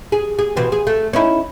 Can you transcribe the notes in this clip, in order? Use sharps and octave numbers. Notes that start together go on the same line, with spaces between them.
G#4
G#4
B2 E3 C4
G#4
A3
C#4 D#4 E4